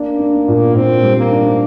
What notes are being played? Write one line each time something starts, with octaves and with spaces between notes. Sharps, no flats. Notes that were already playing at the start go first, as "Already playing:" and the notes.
Already playing: A#3 D4
D4
A#2
A#2 C4
G3
A#3
D4